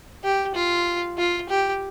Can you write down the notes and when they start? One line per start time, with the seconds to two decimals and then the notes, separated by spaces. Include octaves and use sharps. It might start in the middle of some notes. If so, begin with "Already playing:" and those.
0.24 G4
0.55 F4
1.18 F4
1.49 G4